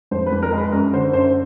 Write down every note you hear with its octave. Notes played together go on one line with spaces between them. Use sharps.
F2 C5
B4
F2
A#4
G#3
B4
F#2 A#4
D3 C5
F#2 C5